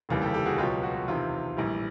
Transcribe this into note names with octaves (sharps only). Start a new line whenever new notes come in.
F1 D#2 C#3 E3 G3
G4 A4
G4 A4
F#4 G#4
C#2 B2 F#3 F4 G4
F#4
E2 C3 D#3 F4
A#1 A2 E3 G3